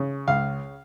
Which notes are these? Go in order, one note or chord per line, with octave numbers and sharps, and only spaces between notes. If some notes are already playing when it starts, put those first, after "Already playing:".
Already playing: C#3
C#2 F5